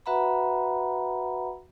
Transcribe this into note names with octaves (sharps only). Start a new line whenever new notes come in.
F#4 B4 E5 F#5 A#5 B5